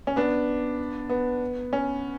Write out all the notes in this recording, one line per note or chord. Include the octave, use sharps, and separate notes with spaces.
C#4
B3 D4
B3
C#4